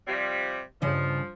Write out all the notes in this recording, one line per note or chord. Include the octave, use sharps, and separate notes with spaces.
C3 F3 G3
G2 C#3 F3 D#5